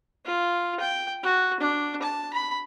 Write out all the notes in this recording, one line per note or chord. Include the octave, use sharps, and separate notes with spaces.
F4
G5
F#4
D4
A5
B5